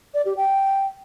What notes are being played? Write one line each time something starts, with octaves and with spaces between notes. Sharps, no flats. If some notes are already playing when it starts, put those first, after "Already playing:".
D5
G4
G5